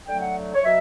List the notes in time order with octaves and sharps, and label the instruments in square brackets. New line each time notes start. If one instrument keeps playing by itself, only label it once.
[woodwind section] D3 F#3 A3 G5
F#5
C#5
B2 F#3 E5